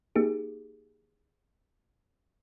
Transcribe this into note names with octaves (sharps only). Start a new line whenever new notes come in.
A#3 D#4 G4 G#4